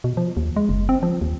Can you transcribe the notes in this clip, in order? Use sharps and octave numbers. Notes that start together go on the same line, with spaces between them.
B2
F3
D#2
G#3
F#1
C4
F3
D#2